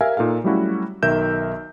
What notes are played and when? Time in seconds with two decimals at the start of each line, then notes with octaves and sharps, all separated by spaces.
0.01 G4 A#4 E5 F5 G#5
0.17 A#2 D#4 A4 F5
0.44 F#3 G3 A3 C#4 E4 F#4
1.03 B1 D#3 A#4 E5 G6 E7